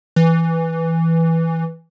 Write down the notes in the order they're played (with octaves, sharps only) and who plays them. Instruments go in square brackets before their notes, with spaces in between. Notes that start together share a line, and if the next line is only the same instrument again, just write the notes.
[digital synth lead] E3